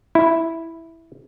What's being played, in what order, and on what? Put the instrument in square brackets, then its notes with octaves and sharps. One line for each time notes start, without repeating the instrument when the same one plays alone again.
[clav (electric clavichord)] E4